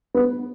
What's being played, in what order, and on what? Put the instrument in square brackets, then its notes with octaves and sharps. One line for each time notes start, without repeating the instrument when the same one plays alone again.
[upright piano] B3